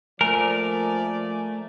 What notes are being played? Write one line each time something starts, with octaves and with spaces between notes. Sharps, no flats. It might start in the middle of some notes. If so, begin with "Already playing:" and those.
F3 A3 A#3 A#4 D5 G#5